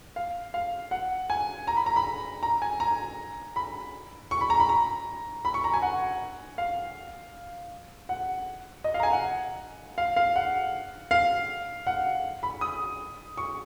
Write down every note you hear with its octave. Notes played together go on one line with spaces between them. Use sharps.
F5
F5
F#5
G#5
A#5
B5
A#5
B5
A#5
G#5
A#5
B5
C#6
B5
A#5
B5
A#5
B5
C#6
A#5
G#5
F#5
F5
F#5
D#5
F5
A#5
G#5
F#5
F5
F5
F#5
F5
F#5
B5
D#6
C#6